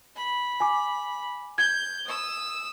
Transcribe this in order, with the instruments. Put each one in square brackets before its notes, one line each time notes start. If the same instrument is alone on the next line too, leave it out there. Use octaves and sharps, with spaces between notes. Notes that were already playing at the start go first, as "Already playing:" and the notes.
[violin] B5
[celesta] G#5 D6
[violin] G6 [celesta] G#6
[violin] D#6 E6